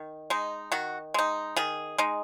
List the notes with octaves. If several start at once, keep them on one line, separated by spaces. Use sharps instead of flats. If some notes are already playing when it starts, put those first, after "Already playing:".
Already playing: D#3
G#3 D#4
D#3 F#4
G#3 D#4
D#3 G#4
G#3 D#4